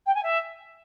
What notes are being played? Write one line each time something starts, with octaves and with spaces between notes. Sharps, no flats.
G5
G#5
E5